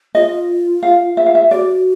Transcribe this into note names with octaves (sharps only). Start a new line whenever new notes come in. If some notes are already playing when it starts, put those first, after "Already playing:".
F4 D#5
F5
E5
F5
E5
F#4 D5